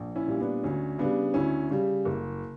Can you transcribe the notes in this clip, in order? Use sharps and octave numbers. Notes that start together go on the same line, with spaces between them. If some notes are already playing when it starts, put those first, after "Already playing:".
Already playing: A#1
C#4 E4
A#2 G3
B3 D4
D2 C#4
C#3 G3 B3 D4
D2 C#4 E4
C#3 G3
F#1